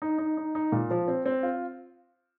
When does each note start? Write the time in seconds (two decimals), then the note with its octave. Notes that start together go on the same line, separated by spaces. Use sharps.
0.02 D#4
0.18 D#4
0.37 D#4
0.55 D#4
0.72 A#2
0.91 F3
1.08 C4
1.26 C4
1.43 F4